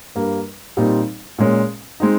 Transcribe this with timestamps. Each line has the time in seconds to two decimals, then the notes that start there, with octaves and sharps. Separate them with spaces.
0.15 G2 G3 A#3
0.77 A#2 G3 C4 D#4
1.38 A#2 G#3 C#4
2.00 G#3 C4 D#4